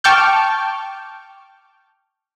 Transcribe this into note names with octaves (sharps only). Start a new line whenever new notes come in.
G5 A5 C#6 D6 F6 G6